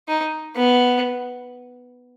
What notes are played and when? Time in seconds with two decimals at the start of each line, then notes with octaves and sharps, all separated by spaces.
0.08 D#4
0.56 B3